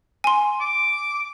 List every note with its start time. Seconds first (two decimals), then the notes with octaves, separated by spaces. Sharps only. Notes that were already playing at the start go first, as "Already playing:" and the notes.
0.24 G#5 C6
0.61 D6